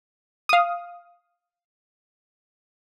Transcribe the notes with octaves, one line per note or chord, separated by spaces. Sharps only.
F5 D#6